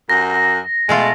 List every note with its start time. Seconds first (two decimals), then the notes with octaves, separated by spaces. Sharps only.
0.10 F#2 A#6
0.89 B2 G#3 A3 F4